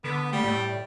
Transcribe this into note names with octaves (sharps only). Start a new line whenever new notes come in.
D3 B3
G3 A3
A2 D5